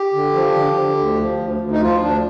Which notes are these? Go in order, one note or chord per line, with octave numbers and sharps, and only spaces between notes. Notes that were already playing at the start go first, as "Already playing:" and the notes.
Already playing: G4
D3
F3
D3
D3
D2
F3
D2
D2
D#4
F3 F4
D2 D4